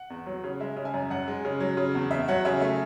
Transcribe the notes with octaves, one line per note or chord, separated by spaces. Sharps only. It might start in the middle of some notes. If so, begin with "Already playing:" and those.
Already playing: F#5
E2
F#3
C#3
G#3 E5
C#3
E5 G#5
F#2
F#2 F#5
G#3
C#3
F#3
C#3
E2
E2 E5
F#3 F#5
C#3 E5 G#5
A3 E5 G#5